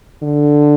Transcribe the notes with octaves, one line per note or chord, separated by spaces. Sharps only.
D3